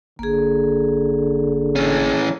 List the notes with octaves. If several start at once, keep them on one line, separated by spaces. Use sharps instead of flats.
G#1 D3 A#3 G#4
E3 C#4